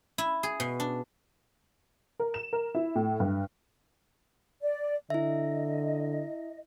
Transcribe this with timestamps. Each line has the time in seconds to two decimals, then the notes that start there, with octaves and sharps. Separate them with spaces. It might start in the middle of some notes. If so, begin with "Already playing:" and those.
0.18 E4
0.43 G#4
0.60 B2
0.80 D4
2.20 A#4
2.34 E7
2.53 A#4
2.75 E4
2.95 A2
3.20 G2
4.62 D5
5.10 D3 E4 D#5 E5